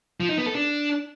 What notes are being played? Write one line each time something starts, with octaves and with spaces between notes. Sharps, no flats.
F3
D#4
B3
A4
D4